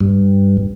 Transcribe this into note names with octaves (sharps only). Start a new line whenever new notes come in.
G2